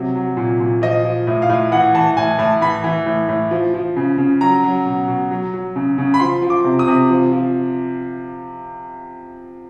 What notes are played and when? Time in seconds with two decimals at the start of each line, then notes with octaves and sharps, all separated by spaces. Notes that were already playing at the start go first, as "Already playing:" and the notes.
Already playing: C3 F#3
0.15 F#3
0.37 A#2
0.60 A#2
0.82 F3 D#5
1.05 F3
1.27 A2
1.42 F5
1.49 A2
1.72 E3 F#5
1.94 E3 A5
2.17 A2 G#5
2.39 A2 A5
2.61 E3 B5
2.84 E3
3.06 A2
3.29 A2
3.51 F3
3.74 F3
3.96 C#3
4.18 C#3
4.41 F#3 A#5
4.64 F#3
4.86 B2
5.08 B2
5.31 F#3
5.54 F#3
5.76 C#3
5.98 C#3
6.14 B5
6.20 F3 C6
6.42 F3
6.50 D6
6.64 C3
6.79 D#6
6.88 C3
7.10 F3
7.32 F3